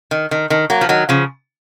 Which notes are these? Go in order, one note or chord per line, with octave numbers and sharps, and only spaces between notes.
D#3
D#3
D#3
F#3 A#3
F3
D#3 F#3
C#3 F3